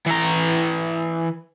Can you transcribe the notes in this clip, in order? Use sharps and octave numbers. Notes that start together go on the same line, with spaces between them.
E3 A#5